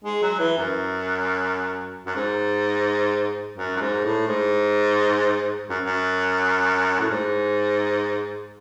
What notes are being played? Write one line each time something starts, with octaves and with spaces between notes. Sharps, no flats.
G#3
F#3
E3
F#2
F#2
G#2
F#2
F#2
G#2
A2
G#2
F#2
F#2
A2
G#2